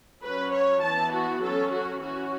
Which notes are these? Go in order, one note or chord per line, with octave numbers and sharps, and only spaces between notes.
F#3 C#4 B4
C#5
E3 B3 A5
F#4
F#3 C#4 A4
F#4
E3 C#4 F#4